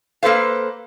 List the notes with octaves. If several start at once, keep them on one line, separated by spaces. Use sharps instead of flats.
A#3 A4 B4 C5 F5